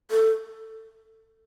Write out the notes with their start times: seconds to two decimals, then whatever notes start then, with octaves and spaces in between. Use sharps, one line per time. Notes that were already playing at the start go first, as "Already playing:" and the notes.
0.11 A4